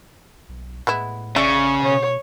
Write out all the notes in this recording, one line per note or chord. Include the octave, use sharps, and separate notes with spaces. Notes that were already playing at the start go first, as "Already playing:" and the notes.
B1
A2 G#3 B3 E4
A1 C#3 D5 E5 C#6
B2 C#5